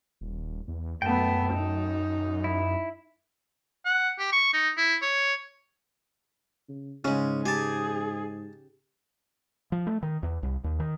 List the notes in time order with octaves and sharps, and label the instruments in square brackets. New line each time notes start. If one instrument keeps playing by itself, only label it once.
[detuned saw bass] D#1
E2
[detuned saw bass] F#2 [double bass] A3 B3 [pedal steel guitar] G5 A5
[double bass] D#4
[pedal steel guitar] E4
[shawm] F#5
G4
C#6
D#4
E4
C#5
[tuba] C#3
[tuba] G#2 [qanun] C#3 G#3 [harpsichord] C#4
[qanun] G4 [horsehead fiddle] G#4 [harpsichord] G#5 A5
[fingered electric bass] F3
A3
D#3
E2
C2
D#2
D#3